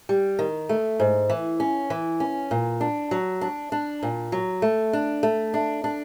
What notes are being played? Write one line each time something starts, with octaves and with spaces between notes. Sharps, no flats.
G3
D#3
A3
G#2
E3
C#4
E3
C#4
A#2
D4
F#3
D4
D4
A#2
F#3
A3
D4
A3
D4
D4